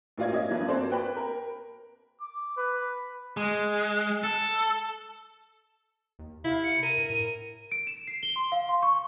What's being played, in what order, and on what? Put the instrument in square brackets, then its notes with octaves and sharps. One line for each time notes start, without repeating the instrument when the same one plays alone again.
[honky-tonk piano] A1 A#3 F4 D5 G#6
C#4 D#5 E5
G2 F3
A#3 C4 F#4 A4 C5 D5
B4 G5 B5
A#4
[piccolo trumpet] D6
B4
[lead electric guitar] G#3
A4
[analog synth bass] D#2
[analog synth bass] C3 [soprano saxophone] E4 [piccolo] F5
[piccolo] C#7
[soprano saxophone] A#4 [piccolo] D#7
[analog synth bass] G2
A2
[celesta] D7
E7
C7
G7
C6
F5
C6
C#6